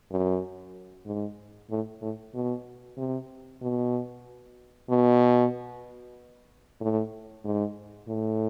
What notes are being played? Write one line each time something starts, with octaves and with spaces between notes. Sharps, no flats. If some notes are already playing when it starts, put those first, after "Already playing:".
F#2
G#2
A2
A2
B2
C3
B2
B2
A2
G#2
A2